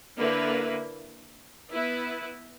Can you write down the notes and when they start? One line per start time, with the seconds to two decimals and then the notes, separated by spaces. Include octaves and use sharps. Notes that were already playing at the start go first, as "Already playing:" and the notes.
0.19 D3 A#3 E4 B4
1.71 B3 E4 B4